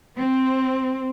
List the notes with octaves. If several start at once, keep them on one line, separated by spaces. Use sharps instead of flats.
C4